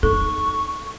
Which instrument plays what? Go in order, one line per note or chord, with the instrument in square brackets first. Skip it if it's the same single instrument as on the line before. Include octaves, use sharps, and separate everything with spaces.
[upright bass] D#4 [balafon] A4 [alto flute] C#6